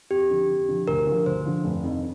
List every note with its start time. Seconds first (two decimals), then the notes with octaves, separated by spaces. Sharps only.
0.11 F2 G4
0.30 D3 F3
0.50 F2
0.68 D3 F3
0.88 D2 A#4
1.06 D3 F3
1.26 D2 C5
1.45 D3 F3
1.64 F1
1.84 F2 D#3